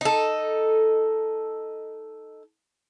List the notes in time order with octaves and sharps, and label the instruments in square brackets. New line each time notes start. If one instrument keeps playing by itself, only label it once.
[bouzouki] D#4 A4